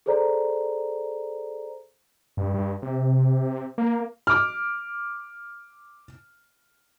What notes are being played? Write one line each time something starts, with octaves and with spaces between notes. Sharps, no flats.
G#4 A4 C5 D5 A#5
G2
G2
C3
A#3
D6 F6